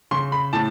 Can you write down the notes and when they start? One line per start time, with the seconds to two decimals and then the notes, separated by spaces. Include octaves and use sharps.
0.11 C#3 C6
0.32 B5
0.53 A2 A5